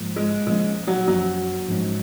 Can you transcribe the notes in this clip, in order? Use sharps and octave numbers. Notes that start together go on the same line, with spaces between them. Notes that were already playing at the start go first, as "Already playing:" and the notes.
Already playing: G#2 F3 A#3
G#3
A#2 F3 G#3 A#3 C#4
F#3
F#2 F3 F#3 A#3 C#4
G#2 F3 G#3 C#4